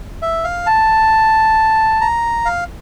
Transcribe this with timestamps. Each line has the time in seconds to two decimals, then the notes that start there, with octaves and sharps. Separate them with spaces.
0.22 E5
0.44 F5
0.67 A5
2.01 A#5
2.45 F5